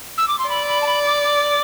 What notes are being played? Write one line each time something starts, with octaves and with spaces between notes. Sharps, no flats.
E6
D6
C6
D5 B5
B5
A5
B5
D6
D6